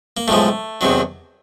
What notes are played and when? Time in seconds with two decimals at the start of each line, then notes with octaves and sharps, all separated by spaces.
0.17 A#3
0.28 B1 A2 F3 G#3 A3
0.81 E2 C3 D#3 F#3